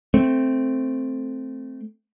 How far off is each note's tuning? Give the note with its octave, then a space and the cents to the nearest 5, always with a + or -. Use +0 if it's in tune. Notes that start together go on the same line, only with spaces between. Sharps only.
A3 +0 C4 +0